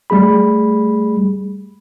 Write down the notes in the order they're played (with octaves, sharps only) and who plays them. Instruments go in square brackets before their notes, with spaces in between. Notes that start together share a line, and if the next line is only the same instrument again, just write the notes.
[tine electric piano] G3 A3 G#4 B5